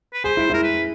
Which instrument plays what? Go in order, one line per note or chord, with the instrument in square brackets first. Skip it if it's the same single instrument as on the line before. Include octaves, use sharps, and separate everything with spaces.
[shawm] B4
[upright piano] G#4 [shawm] C5
[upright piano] E4
[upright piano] E4 [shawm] A#4
[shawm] B4